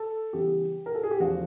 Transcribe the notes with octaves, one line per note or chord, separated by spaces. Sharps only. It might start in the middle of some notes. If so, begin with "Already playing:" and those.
Already playing: A4
C#3 E3 G3 B3 G4
A#4
A4
G#4
G4
E2 C#3 F3 A3 F#4